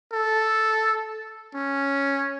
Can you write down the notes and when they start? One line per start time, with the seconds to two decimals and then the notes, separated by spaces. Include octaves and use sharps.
0.12 A4
1.54 C#4